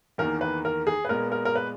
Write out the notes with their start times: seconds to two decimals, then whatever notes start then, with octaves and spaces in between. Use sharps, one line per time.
0.18 E2 D#3 A#3 A#4
0.41 B4
0.65 A#4
0.87 G#4
1.05 B4
1.09 A#2 G#3 B3 A#4
1.32 A#4
1.45 A#4
1.56 B4